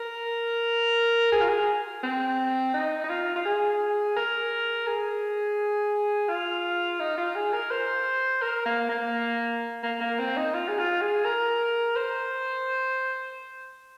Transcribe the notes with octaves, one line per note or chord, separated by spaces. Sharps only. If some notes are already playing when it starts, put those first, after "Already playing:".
Already playing: A#4
G#4
F4
G#4
C4
D#4
D#4
F4
F4
G#4
A#4
G#4
F4
D#4
F4
G#4
A#4
C5
A#4
A#3
A#3
A#3
A#3
C4
D#4
F4
G#4
F4
G#4
A#4
C5